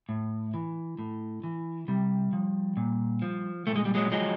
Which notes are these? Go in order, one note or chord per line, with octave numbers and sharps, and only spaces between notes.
A2
E3
A2
E3
C3 G3
F3
A#2
F3
A#2 A3
G#3
G3
F#3 G#3
F3 F#3 G#3